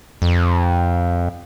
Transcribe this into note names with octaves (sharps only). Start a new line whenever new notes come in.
F2